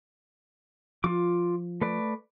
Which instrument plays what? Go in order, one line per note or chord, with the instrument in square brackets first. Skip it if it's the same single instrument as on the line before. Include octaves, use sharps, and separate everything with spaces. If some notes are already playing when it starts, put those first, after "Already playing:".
[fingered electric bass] F3 [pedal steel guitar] F4 D6
[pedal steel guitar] A3 B4 D5